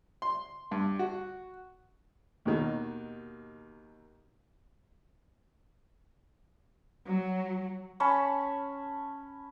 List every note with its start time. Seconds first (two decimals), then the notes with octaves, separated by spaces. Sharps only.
0.22 C6
0.71 G2
0.99 F#4
2.45 D#2 B2 D#3
7.06 F#3
8.00 C#4 A5 B5 C#6